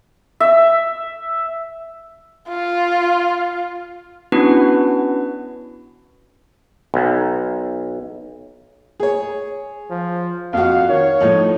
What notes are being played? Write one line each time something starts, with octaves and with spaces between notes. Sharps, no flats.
E5
F4
B3 C#4 D4 E4 F#4 B4
B1
G#4 C#5
F3
F2 F#4 F5
D#3 C#5
A2 F3 D#4